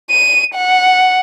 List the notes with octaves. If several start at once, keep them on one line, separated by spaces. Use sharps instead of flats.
D#7
F#5